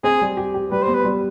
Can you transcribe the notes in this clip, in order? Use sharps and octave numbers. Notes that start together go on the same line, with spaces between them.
C4 G#4
G3
G4
G4
G3 B4
C5
B3
B4
G3